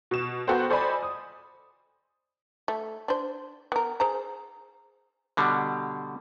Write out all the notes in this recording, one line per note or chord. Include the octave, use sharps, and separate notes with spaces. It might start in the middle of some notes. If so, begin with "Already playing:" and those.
B2 E7
B3 F#4 A4 A#4 C5 G5
A4 C5 D5 D#5 G#5 B5
D#6
A3
D4 C5
B3 A#4
G#4 C5 A#5
B2 D3 G3